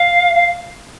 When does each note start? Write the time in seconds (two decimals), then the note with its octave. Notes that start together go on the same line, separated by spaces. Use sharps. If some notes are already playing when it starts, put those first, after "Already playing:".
Already playing: F5
0.34 F5